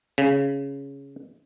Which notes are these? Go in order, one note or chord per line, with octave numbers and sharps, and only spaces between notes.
C#3